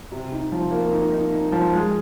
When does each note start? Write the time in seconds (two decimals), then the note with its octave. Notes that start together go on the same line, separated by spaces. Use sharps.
0.12 C3
0.32 D#4
0.52 F3
0.71 A#3
0.93 D#4
1.12 D#4
1.32 D#4
1.52 F3
1.73 G#3